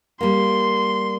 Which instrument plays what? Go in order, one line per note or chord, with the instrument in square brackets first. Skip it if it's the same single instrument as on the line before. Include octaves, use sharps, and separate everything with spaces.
[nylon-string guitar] G3 A#3 [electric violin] C6